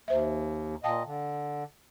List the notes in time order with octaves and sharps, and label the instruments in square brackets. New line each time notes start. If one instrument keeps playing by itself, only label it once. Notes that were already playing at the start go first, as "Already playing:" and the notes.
[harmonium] D#2 [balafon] C5 E5
[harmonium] A#2 D#5 [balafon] F5 G5 A5
[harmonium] D3